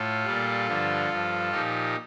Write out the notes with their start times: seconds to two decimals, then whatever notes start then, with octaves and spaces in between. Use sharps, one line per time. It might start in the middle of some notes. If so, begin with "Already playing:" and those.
Already playing: A2 F4 A4
0.25 A#2 G3
0.67 G2 D3 F3
1.10 G2 F3
1.52 A#2 F3 D#4 G4